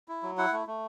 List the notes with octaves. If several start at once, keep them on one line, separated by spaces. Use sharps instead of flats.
E4
F#3
E4 F#5
A3
A3